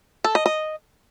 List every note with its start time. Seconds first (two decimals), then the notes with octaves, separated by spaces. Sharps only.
0.24 A4
0.35 D#5
0.46 D#5